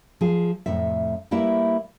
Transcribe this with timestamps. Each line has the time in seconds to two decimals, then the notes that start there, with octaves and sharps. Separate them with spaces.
0.21 F3 G#4
0.66 F2 A2 C3 E5
1.31 G3 A#3 E4 B4 E5